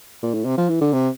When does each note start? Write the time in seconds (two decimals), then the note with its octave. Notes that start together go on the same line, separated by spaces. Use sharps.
0.23 A#2
0.34 A2
0.45 C3
0.58 F3
0.70 E3
0.81 D3
0.93 C3